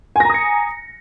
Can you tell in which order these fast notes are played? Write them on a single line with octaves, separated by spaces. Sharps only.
G#5 A#6 A#5 D#6 C#7